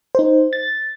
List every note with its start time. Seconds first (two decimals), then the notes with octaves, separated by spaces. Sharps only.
0.15 D#4 C5
0.53 A6